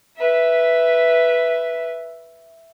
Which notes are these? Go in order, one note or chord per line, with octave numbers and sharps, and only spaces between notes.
B4 E5